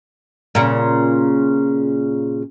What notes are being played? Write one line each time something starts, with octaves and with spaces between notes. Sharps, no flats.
A#2 C#3